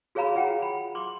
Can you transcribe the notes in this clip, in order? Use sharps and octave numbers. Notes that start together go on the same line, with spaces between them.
F#4 G#4 C#5 F5 A#5 B5
F4 G#4 F#5 G5
B5
C6 D6